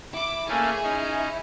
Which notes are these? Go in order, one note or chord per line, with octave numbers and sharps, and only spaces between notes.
E4 D6
A3 A#3 C#4 E4 G#4 G#5
C#4 D#4